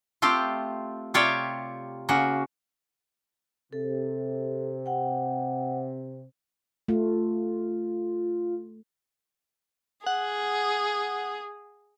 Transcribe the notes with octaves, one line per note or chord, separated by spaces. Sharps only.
A3 C4 F4 G4
C3 F4 G4 C#5 D5 E5
C#3 A#3 F#4
C3 A4
F#5 G5
A3 F4
G#4 F#5